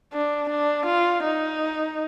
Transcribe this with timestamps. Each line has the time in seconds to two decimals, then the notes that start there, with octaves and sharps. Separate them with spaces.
0.13 D4
0.49 D4
0.86 F4
1.24 D#4